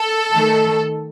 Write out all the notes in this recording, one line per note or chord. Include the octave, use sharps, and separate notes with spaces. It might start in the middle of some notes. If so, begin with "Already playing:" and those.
Already playing: A4
D#3 A3